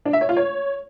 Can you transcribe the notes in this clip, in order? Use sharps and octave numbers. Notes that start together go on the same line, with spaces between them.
D4
E5
C#5
F4
C#5